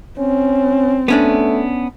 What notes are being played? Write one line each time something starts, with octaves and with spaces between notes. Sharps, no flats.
C4 C#4
A3 B3 C#4 D4